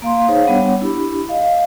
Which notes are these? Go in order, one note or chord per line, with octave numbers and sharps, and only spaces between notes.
A#3 F5 C6
D#4 G#4 C5 C#5 F5
G3 B3 D4 C#5 F#5
D4 E4 G4 B5
D#5 F5